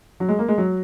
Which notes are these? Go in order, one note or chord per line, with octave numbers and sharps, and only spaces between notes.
F#3
G#3
A#3
G#3
F#3